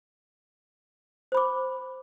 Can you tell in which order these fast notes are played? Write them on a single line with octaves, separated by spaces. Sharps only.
C5 B5 D6